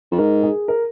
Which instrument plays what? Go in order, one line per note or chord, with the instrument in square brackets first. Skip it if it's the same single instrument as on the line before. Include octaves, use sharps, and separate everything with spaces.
[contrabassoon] F2
[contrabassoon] G#2 [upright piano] A#4
[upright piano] G#4
A#4